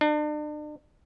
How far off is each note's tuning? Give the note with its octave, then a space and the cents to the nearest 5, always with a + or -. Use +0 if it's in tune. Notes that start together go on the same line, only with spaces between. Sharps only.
D4 +40